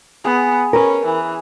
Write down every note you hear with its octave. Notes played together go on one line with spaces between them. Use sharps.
B3 G#4
C#4 A#4 B4
E3